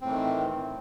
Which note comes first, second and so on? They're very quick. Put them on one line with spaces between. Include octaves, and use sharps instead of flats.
C4 A2 E3 D#3